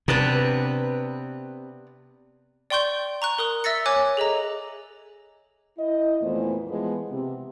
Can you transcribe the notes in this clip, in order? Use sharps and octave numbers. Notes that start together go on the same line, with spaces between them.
C3 B3 D4 B4
D5 G5 C6 C#6 G6 G7
A#5 C#6 F#6
A#4 D#6 F#6
E5 E6 A6 A#6 C#7
C#5 G#5 D6 F#6
G#4 A4 D#5 A#5
E4 D#5
F2 A#2 E3 A3 B3 C5
E3 F3 G#3 B3
C3